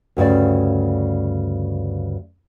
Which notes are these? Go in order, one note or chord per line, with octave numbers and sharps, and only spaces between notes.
D2 G2 C#3 D5